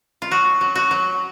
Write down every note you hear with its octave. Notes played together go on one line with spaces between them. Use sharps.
F4
F#3 F#4
F#3
F#4
F#3